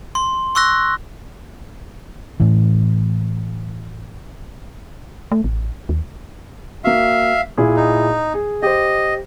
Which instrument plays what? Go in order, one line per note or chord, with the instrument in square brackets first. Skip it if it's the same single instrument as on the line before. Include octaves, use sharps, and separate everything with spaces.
[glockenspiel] C6
C6 C#6 E6 F#6 A#6
[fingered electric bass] A2 E3
[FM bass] A3
A1
D#2
[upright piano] A#3 F#4 [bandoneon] E5 F5
[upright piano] A#2 E4 G#4
[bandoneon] D#4
[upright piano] G#4
[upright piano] G4 C5 [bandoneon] D#5